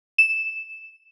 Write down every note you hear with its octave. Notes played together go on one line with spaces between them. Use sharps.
E7